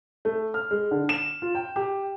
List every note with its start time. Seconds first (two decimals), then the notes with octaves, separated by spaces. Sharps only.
0.25 A3
0.54 F6
0.71 G#3
0.91 D3
1.09 E7
1.42 F4
1.55 G5
1.76 G4